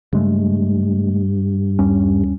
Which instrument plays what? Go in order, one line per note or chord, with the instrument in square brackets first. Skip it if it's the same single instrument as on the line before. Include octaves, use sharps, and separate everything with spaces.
[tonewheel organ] G2 [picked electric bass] C#3 G#3 A3
[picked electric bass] D#2 G3 C#4